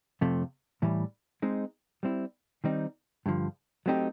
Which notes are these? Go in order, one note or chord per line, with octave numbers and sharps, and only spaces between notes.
F2 C3 F3 A3
A2 E3 G3
G#3 C4 D#4
G3 C4 E4
D#3 G3 C4 D#4
G2 D3 F3
F#3 A3 C4 D#4 G4